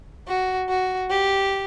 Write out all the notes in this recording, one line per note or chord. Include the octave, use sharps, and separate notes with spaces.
F#4
F#4
G4